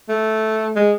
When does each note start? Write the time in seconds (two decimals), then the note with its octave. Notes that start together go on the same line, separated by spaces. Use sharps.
0.09 A3
0.76 G#3